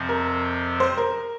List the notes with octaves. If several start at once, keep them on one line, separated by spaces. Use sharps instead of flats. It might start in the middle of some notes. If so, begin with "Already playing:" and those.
Already playing: F2 C3 F3 C4
A#4
C5
A#4